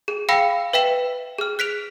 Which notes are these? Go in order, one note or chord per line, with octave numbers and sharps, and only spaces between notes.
G#4
F5 G5 B5 E6 A#6 C#7
B4 E5 G5 B6 E7
G#4 F6
F#6 B6 D7 F7